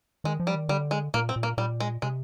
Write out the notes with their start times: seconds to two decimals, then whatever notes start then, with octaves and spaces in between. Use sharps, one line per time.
0.24 D#3 G#3
0.40 F3
0.47 G3
0.55 D#3
0.69 D3 G3
0.91 G#3
1.14 A#2 A#3
1.29 C4
1.36 A#2
1.43 A#3
1.58 A#2 G3
1.80 G#3
2.02 C3 G#3